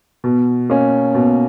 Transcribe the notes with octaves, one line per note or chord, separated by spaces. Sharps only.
B2
A#3 C#4
B2